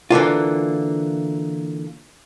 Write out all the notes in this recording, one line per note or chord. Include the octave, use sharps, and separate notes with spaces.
D3 E3 A#3 F4